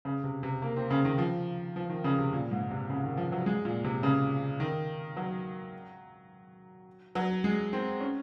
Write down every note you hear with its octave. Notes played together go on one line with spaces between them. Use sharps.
C#3
C3
C3
A#3
C4
C#3
D#3
F3
F3
D#3
C#3
C3
A#2
G#2
C3
C#3
D#3
F3
F#3
G#3
A#2
C3
C#3
D#3
F#3
F#3
G#3
C4
C#4